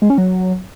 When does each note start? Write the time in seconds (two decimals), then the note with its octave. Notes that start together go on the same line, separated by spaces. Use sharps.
0.02 G#3
0.10 C#4
0.18 F#3